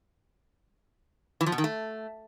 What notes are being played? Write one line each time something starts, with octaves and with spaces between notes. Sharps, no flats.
E3
F3
B2
D#3
A3